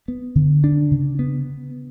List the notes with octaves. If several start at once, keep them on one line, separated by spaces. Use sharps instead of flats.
B3
D3
D4
C#3
B3